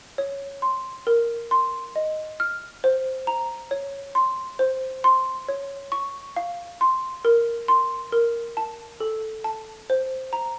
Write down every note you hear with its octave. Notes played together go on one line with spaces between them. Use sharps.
C#5
C6
A#4
C6
D#5
F6
C5
A#5
C#5
C6
C5
C6
C#5
C#6
F5
C6
A#4
C6
A#4
A5
A4
A5
C5
A#5